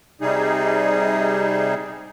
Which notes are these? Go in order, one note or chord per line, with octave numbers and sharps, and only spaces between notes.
C3 G3 D#4 G#4